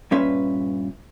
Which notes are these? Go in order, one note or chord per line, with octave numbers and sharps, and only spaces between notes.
G2 A#2 C#4 B4 E5 C6